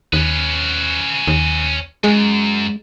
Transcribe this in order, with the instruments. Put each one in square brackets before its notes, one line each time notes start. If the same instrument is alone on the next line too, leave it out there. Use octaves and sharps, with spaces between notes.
[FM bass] D#2 [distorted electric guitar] C#4 B4
[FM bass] D#2
[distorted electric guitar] F#2 [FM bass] G#3